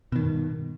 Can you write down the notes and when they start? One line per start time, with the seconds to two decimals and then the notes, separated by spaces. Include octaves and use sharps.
0.12 B2
0.16 D#3
0.19 G2